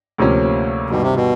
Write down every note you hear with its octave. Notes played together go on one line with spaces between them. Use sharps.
D2 C3 F3 A#3 C#4
G2 B2 D#3 G3
C3
B2